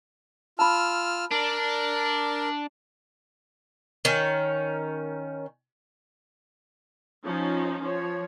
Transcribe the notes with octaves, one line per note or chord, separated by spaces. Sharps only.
F4 A5 B5 E6 F6
D4 A#4
D#3 C#4
F3 C#4 D#4
F3 C#5